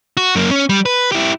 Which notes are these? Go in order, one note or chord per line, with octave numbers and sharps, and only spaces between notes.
F#4
F#2 A#3
C#4
G3
B4
E4 G4